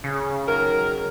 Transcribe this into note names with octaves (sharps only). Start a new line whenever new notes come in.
C#3
D#3 F#3 A#4